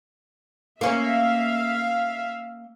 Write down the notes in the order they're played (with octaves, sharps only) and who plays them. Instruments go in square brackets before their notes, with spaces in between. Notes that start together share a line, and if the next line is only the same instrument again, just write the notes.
[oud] A#3 C#4 [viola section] E5 F5